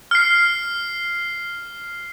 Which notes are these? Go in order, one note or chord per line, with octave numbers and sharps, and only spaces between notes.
F6 C7